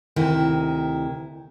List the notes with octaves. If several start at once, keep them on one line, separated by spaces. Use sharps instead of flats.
D2 C3 D#3 E4